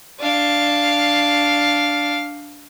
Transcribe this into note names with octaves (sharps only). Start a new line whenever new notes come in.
D4 F5